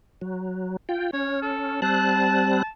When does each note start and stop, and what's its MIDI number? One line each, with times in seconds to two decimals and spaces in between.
0.21 0.77 54
0.89 1.11 65
0.89 1.11 79
1.13 1.81 61
1.13 1.42 73
1.42 1.80 69
1.82 2.62 55
1.82 2.62 60
1.82 2.68 81
1.82 2.62 90